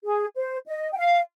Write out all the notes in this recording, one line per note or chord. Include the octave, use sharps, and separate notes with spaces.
G#4
C5
D#5
G5
F5